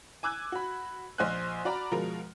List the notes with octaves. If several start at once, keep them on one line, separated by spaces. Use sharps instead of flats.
G#5 D6 E6 F#6 G#6
F#4 B5
A#1 C5 D#5 G#5 F6 F#6
F#4 D5 A#5 B5
B2 F3 G#3 A#4